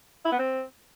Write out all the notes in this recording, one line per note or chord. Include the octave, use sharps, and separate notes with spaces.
E4
B3
C4